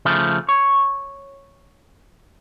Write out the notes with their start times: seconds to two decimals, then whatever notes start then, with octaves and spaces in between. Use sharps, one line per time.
0.05 C#3 F3 A3
0.49 C#5